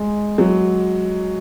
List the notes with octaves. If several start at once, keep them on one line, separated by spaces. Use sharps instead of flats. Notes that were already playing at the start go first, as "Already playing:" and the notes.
Already playing: G#3
F#3